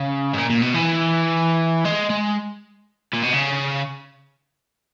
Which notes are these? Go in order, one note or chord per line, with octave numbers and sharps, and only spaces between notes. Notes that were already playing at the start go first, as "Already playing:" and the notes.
Already playing: C#3
G#2
A#2
A#2
B2
E3
G#3
G#3
A#2
B2
C#3